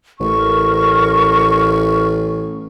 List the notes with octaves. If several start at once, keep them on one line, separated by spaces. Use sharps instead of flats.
A1 A#4 C#6